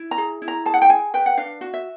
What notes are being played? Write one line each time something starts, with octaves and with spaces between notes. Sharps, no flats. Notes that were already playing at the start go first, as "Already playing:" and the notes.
Already playing: E4
A#5
G#4
E4
A#5
G#4 A5
F#5
G5
G#4 G#5
B4 G5
F#5
D4 F5
F#4
E5